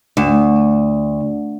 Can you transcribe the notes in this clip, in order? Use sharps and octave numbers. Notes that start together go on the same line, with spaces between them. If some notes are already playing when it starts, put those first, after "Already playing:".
D2